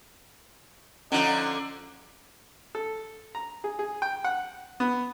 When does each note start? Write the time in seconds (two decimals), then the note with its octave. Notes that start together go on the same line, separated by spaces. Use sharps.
1.12 D3 F3 C#4 D#4 F4
2.75 A4
3.35 A#5
3.64 G#4
3.79 G#4
4.02 G5
4.24 F#5
4.80 B3